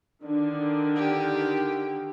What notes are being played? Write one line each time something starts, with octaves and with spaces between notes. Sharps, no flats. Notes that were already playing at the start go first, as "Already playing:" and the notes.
D3 D#3 D4
G4